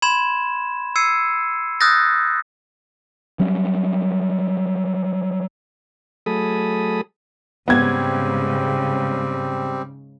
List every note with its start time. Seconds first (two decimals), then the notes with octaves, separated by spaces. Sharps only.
0.02 B5 C6 G#6 E7
0.96 E6 G#6 C7 C#7 D#7
1.81 D#6 E6 F#6 G6 A6 A#6
3.40 F#3 G3 C#4
6.26 F#3 A3 G#4 A4 B5 D#6
7.68 G#2 C#3 G3 B3 C4 G#6